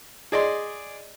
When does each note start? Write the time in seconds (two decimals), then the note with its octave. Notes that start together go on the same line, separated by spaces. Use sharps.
0.32 G#4 D5 D#5 C6